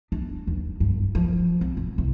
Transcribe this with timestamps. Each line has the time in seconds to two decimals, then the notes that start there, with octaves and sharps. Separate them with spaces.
0.12 D4
0.47 D#2
0.80 G2
1.15 F3
1.61 C4
1.77 G#2
1.98 C2